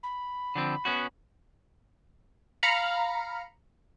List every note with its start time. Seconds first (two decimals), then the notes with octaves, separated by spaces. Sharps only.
0.03 B5
0.55 D3 F3 C4
0.85 B3 C#4 F#4
2.63 F5 A#5 B5 F6 C#7